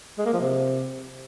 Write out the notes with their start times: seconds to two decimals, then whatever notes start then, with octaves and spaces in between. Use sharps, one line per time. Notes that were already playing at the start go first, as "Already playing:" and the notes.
0.18 G#3
0.26 A#3
0.33 F3
0.41 C3